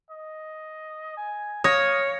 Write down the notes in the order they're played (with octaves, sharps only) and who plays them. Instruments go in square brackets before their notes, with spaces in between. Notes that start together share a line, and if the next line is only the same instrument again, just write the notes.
[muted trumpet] D#5
G#5
[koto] C#5 [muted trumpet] F5 [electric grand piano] D#6 A#6